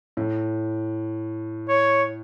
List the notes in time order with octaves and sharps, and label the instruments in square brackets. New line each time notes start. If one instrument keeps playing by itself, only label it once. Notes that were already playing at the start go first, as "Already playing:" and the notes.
[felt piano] A2
[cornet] C#5